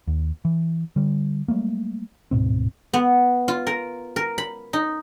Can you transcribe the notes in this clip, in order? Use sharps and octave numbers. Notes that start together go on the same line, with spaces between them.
D#2
E3
D3 G3
F#3 G3 A3 A#3
D1 G#2 B2 C4
B3
F4
A#4
A#4
B5
D#4